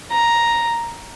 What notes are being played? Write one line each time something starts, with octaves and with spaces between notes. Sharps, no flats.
A#5